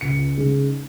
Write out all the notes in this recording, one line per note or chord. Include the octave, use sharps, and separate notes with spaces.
C#2 C#7
C#3 G#3 D#4